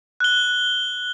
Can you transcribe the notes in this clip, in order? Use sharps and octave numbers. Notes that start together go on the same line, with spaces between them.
F#6 G7